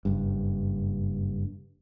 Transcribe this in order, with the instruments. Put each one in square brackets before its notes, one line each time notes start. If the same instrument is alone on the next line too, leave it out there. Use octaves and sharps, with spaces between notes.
[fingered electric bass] F#1 G2